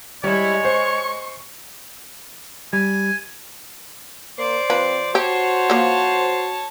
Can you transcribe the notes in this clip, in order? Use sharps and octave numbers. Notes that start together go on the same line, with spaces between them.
G3 G#3 E4 C#5
C5 C#6
G3 G#5
A#3 C5 D5
F3 C4 B4
F#4 G4 C#5 A5
F3 A#3